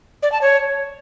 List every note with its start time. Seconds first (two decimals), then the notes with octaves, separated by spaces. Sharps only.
0.23 D5
0.32 A5
0.41 C#5